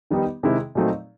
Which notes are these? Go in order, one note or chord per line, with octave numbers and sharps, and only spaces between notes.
D#3 G3 B3 D#4 G4
C3 D#3 G#3 C4 E4
A#2 F#3 A3 C4 D#4